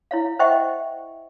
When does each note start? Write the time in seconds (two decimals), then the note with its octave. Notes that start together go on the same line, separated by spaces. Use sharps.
0.11 E4 C#5 F5
0.39 C5 D#5 E5 F#5 G5 C#6